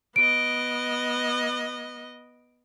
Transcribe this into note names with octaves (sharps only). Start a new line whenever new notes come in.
B3 D#5 D7